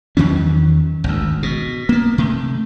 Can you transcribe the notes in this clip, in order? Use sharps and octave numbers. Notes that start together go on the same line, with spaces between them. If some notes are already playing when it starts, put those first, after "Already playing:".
E2 D#3 F#3 C#4
G#1 D2
B2
A#3 B3
C3 A3